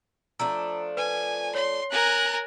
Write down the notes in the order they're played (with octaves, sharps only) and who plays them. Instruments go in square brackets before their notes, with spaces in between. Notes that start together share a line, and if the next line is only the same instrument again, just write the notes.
[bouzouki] F3 A3 D4 [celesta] A#5 E6
[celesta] B4 [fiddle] G#5
[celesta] C#5 [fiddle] C6
[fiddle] A#4 G#5 [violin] A#5 F#6